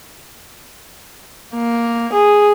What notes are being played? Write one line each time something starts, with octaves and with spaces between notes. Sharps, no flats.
A#3
G#4